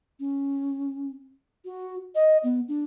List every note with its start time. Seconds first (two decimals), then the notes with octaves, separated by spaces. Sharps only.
0.20 C#4
1.65 F#4
2.15 D#5
2.44 B3
2.68 D4